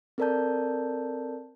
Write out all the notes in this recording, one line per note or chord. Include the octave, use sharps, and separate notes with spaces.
C4 A4 A#4 D5 A5 G6